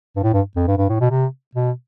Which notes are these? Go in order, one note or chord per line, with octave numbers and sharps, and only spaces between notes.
G2
A2
G2
F2
G2
G2
A2
B2
C3
B2